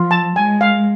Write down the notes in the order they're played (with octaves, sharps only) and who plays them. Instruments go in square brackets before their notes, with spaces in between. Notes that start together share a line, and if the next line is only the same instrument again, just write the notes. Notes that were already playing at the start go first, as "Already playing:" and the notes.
Already playing: [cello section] F3 [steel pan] F4
[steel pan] A5
[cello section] G#3 [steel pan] G#5
[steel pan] F5